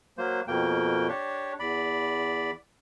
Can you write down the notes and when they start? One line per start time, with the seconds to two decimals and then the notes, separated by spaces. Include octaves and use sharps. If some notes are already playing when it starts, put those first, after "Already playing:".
0.18 F#3 A#3 C5
0.48 F2 B2 A#3 G5
1.08 D4 G4 C#5
1.59 E2 D5 B5